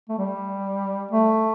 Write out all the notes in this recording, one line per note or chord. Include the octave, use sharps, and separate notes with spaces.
A3
G3
A3